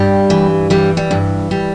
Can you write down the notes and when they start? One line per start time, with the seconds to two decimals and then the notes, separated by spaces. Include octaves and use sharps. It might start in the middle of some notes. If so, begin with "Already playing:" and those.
Already playing: G2 G3
0.30 E3
0.70 E3 G3
0.97 G3
1.11 G2
1.51 G3